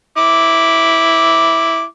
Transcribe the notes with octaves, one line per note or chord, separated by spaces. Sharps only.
E4 D6